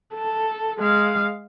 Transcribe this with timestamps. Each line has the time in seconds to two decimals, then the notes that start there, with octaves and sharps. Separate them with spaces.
0.14 A4
0.79 G#3 F5